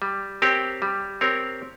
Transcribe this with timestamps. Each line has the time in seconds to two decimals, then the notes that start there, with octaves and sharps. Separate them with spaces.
0.02 G3
0.42 C4 G4 A#4 C#5
0.82 G3
1.21 C4 G4 A#4 C#5